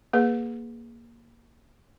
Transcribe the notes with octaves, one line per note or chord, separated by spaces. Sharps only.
A#3 G#4 B4